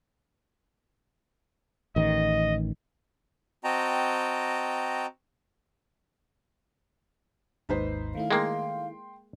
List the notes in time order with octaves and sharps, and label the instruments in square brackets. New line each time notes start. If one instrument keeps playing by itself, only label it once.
[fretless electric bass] A1 D#3 [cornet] D#5
[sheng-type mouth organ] C4 F#4 D#5 G5 A5 A#5
[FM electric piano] G#1 D#2 G#2 [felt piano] D#4 B4 C5
[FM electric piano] D#3 A3 E4 [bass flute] F5
[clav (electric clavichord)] G#3 A#3 [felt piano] G5 C6